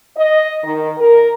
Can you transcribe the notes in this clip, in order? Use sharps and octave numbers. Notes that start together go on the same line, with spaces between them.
D#5
D#3
A#4